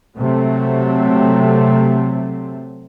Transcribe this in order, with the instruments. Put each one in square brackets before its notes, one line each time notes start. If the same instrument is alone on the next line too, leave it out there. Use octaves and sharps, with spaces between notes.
[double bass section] C3 F#3 A3 C4